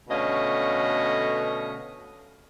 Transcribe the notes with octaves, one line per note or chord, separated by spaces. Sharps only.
B2 D3 A3 C#4 D#5 F5